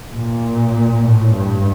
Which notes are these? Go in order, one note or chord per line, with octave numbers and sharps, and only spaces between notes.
A#2
A2
G2